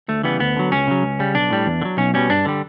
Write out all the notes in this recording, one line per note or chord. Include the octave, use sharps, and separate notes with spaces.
D2 A3
C#3 E3 G3 B3
D2 B3
D3 F#3
C#2 C#4
C#3 F#3
C#2
C#3 G3
B1 D4
A2 G3
E2
D3
F#3
B1 C#4
B2 G3 C#4
G2 D4
D3 G3